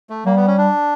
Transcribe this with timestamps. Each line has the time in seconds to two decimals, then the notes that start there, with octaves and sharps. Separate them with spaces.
0.10 A3
0.26 G3 A#3
0.36 B3
0.47 C#4
0.58 D4